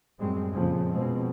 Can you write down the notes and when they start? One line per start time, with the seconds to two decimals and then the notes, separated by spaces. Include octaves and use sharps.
0.20 F#2 A2 G3 G#3 C4
0.52 F2 A#2 C#3 F3
0.89 B2 F3 G#3 C4